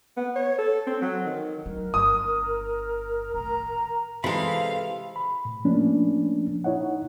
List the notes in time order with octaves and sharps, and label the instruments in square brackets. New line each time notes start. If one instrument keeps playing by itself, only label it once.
[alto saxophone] B3
C#5
A4
C4
F#3
D#3
[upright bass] F#3 [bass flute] A#4
[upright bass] G1 [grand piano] D#6
[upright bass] A2 D#3 [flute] A#5
[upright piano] C3 [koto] E3 G#3 [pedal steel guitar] A4 C5 B5 [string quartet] F5
[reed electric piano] B5
A2
F3 A3 A#3 C#4 D4
D#4 E4 C#5 D#5 F#5